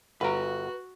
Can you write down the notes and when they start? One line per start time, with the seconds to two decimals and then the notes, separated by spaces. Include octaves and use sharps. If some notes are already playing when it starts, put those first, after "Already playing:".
0.21 G1 F#4 B4 A#5